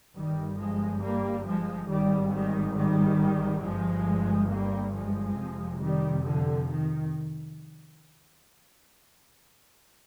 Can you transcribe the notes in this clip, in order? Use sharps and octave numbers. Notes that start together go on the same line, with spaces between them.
G1 G2 D#3 G3
F3 G#3
G3 A#3
F3 G#3
G#1 G#2 D#3 G3
D#3 G3
D#3 G3
G1 G2 F3 G#3
G3 A#3
F3 G#3
F1 F2 C3
D#3 G3
D3 F3
D#3